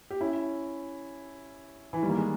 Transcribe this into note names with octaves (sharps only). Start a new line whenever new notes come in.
G4
C#4 E4
E3
D#3 G3
A#3
G#3